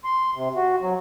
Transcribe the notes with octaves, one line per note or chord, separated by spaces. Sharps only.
C6
C3
F#4
F#3